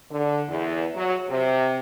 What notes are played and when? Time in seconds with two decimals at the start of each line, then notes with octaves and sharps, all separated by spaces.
0.10 D3
0.49 E2
0.94 F#3
1.29 C3